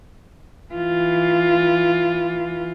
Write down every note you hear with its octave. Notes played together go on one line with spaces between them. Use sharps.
E3 F4